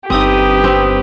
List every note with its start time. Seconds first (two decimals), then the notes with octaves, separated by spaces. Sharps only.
0.10 G1 C4 D#4 G4 B4 D#6
0.64 C4